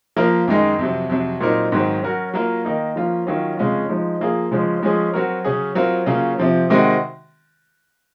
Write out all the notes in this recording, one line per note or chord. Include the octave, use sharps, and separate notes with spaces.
F3 A#3 F4 A#4
F#2 D#3 G#3 D#4
F2 C3 F#3
F2 C3 F#3
A#2 F#3 C4 D#4 A#4
G#2 D#3 F#3 C4
F#3 C#4 F#4 A#4
F#3 A#3 F4 A#4
D#3 A#3 D#4
F3 A#3 C#4 F4
D#3 F#3 C#4 F4
F2 C#3 G#3 C#4 F4
F3 G#3 D#4
F3 A#3 F4 G#4
C#3 F3 G#3 C#4
F3 G#3 C#4 G#4
F#3 C4 F#4 A#4
C#3 F#3 C#4 G#4
F#3 C4 F4 A#4
C#3 F#3 A#3 C#4 F4
C3 F3 C4
C3 D#3 G#3 C4 F#4